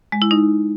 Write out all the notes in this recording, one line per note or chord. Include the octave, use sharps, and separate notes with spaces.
G#3
E4
D#4